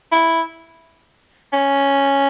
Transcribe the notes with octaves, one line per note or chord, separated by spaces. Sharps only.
E4
C#4